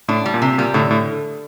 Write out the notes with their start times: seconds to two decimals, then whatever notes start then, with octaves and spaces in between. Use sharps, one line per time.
0.08 A2 D4
0.26 G3
0.34 A#2
0.42 C3
0.58 A#2 G3
0.74 A2 D3
0.91 A2